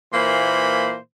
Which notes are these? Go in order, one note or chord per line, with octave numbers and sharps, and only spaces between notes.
A#2 E3 A#3 C5 B5